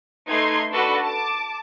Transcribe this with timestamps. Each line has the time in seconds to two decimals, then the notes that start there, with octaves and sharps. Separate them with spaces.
0.28 A3 D#4 B4 C6 G#6
0.72 D4 F#4 A4 B4
1.04 A5 D6